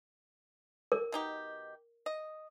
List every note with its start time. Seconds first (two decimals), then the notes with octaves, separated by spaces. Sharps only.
0.92 A#4
1.12 B2 D#4 G4
2.06 D#5